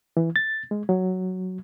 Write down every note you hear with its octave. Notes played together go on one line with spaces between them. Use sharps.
E3
A6
G#3
F#3